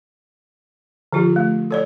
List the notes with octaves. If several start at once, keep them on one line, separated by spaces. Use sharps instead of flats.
D3 F3 F4 G4
A3
A4 C#5 D5